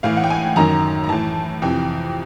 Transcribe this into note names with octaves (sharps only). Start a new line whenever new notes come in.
A2 E3 F5
F#5
G5
G#5
F#2 D#3 A#5
A#5
A2 E3 A5
F2 C3 E3 G5